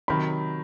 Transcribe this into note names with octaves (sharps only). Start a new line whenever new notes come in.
C3 D#3 F#3 B5